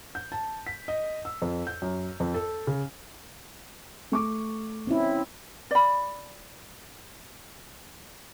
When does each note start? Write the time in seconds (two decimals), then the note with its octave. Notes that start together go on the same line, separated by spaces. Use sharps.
0.15 G6
0.32 A5
0.67 B6
0.88 D#5
1.25 E6
1.42 F2
1.67 G6
1.82 F#2
2.20 F2
2.34 A4
2.67 C#3
4.12 A3 C#6 D6
4.87 C4 C#4 E4
5.71 D5 B5